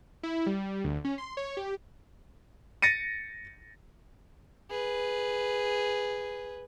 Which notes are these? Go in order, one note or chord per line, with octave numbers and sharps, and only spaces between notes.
E4
G3
D2
C#4
C6
C#5
G4
A6 A#6 C#7 D#7
G#4 B4